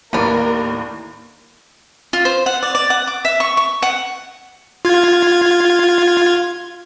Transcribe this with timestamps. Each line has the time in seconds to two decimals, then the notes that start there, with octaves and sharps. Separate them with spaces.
0.13 D#2 A2 A#3 B3 D4 A#4
2.13 F4
2.25 C5
2.46 F#5
2.63 D5
2.75 D5
2.90 F#5
3.07 D6
3.25 E5
3.40 C#6
3.57 C#6
3.82 F#5
4.85 F4 G#6